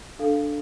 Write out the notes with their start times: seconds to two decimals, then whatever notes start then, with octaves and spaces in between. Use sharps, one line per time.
0.19 D4 A4 F5